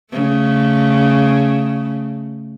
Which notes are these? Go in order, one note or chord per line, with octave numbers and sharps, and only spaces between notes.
C#3 A3